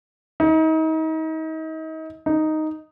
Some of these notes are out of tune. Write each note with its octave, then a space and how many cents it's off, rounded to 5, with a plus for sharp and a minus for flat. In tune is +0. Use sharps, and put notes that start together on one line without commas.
D#4 +35
D#4 +0